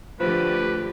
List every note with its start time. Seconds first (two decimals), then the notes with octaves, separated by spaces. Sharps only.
0.20 D3 F3 A3 G4 B4